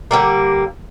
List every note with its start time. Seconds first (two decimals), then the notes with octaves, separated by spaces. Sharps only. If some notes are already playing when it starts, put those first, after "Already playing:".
0.11 D3 G3 A#3